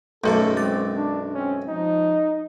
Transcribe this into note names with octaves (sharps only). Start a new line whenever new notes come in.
B1 F#2 A3 G#4 A4 C#6
G#3 C4 D6 A6
D4
C4 C#4
F3 D#4